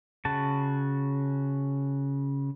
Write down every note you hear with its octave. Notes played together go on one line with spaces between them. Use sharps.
C#3 F#4 A5